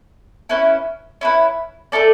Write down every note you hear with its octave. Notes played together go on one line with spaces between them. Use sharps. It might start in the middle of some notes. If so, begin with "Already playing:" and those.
C#4 E4 B4
C#4 E4 B4
A3 E4 A4 D5